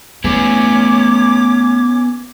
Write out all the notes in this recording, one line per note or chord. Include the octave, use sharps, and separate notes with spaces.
A3 B3 C#4 G#4 D6 G#6